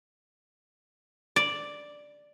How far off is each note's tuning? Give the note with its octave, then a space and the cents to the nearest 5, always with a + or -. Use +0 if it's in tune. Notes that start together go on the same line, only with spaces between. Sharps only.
D5 +0